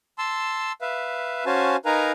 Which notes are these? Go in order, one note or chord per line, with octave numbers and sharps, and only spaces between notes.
A5 C6 E6
B4 E5 F5
C#4 F#4 C5 F5 G#5 A5
D#4 A#4 B4 F5 G#5 A#5